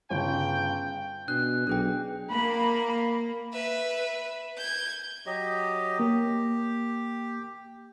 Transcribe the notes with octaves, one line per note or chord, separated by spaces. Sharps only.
G1 C#3 G5
B2 D4 F#6
B1 D4 G#4 G5
A#3 B5
B4 E5
G6 G#6
F#3 G4 D#5
A#3 G4